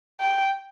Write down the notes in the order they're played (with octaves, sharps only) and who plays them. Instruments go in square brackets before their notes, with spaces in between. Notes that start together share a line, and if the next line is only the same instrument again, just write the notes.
[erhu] G5